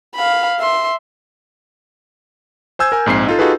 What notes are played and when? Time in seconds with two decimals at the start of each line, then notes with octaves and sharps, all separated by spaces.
0.15 F5 B5
0.60 E5 C6
2.79 C5 G#5 E6 G6 G#6
2.92 A#4 G#5
3.06 A#1 G#2 C4 C7
3.26 D#4 F4 A4
3.39 D#4 F4 F#4 G#4 A4 B4